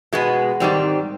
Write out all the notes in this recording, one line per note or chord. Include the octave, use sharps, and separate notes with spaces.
B2 G#3 B3
G#2 D#3 G3 C4